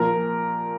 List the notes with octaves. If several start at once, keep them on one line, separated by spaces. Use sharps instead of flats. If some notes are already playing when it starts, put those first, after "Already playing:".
Already playing: A#2 F3 A#4